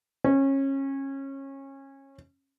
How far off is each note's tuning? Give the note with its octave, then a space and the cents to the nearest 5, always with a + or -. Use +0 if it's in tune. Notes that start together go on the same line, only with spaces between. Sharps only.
C#4 -25